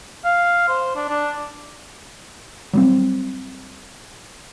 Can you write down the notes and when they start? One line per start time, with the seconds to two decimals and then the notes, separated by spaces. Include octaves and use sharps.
0.25 F5
0.68 C5
0.96 D4
1.09 D4
2.73 F#3 G3 C4